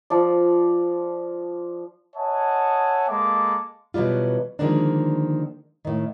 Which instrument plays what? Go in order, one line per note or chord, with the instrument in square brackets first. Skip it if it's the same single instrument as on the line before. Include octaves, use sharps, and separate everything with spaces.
[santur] F3 D5
[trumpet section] C#5 D#5 E5 F#5 G#5 A5
G#3 A#3 A4 D6
[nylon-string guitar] B2 E3 F#3 G3 F4
D3 D#3 F3 G#3 A#3 D4
A2 D#3